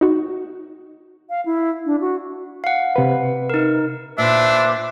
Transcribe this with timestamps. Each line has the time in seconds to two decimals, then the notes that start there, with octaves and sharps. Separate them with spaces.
0.01 D#4 F#4
1.30 F5
1.46 E4
1.86 D4
2.01 F#4
2.64 F5 F#5
2.96 C3 B4
3.50 D#4 A#4
4.18 A#2 D4 B4 C5 E5 D6